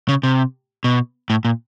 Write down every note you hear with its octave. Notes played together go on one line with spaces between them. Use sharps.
C#3
C3
B2
A2
A#2